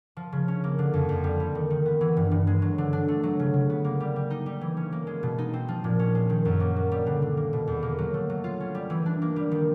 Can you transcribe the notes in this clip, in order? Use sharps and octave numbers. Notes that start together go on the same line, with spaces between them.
F3
C#3
C#4
A#3
D3
F2
F2
G3
G3
D#3
D#3
B3
E3
G2
G2
G#3
F#3
D3
D4
A3
F#3
C#3
C#3
B3
A#3
G3
G3
D#4
G3
E3
C#4
A#3
G#3
B2
D#4
C4
F3
A#2
C#4
G#3
D#3
F#2
A#3
F#3
G3
D3
D3
A#3
B2
E2
A#3
F#3
A3
F#3
F4
C#4
G3
E3
D4
A#3
G3
D#3